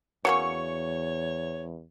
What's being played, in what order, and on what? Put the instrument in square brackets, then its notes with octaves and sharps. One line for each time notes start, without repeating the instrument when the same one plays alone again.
[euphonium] E2 [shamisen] F#3 A#3 C#4 [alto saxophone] C#5 [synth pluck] C#6